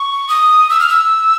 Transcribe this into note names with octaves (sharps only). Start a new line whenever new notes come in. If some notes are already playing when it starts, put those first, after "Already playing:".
Already playing: C#6
D#6
E6
F6
E6